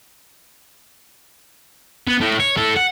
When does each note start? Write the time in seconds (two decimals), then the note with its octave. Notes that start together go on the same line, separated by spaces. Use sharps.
2.08 B3
2.21 A2
2.40 C#5
2.57 E4 A4
2.77 F#5